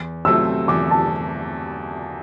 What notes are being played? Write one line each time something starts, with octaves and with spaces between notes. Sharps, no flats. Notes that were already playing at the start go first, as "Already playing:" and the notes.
Already playing: E2
C3 F#3 A3 C4 E6
E2 D6
A5